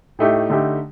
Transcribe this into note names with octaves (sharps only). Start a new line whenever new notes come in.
A2 A3 D#4 G4
D3 A3 D#4 G4